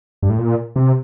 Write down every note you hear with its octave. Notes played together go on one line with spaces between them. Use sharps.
G2
A2
A#2
C3